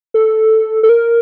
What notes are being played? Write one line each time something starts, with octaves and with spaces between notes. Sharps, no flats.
A4
A4
A#4